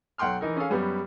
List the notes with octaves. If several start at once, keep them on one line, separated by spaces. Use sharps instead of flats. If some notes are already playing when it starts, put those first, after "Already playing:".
B1 F#5 G5 C6 F6
E3 D#4 A#4
C#4 G#4 A4 F5
F#2 G3 B3